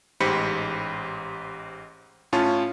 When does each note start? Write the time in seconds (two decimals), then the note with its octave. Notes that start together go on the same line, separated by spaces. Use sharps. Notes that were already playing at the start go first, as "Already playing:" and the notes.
0.20 A1 G#2 G4 C5 B5 C#7
2.33 A2 C#4 F4 A5